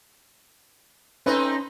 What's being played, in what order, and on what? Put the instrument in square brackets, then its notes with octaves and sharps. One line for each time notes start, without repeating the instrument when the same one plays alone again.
[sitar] A3 C4 D#4 [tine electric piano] C#4 [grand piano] B4